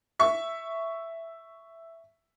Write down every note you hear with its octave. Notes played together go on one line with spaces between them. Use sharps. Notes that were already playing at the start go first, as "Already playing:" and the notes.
E5 C#6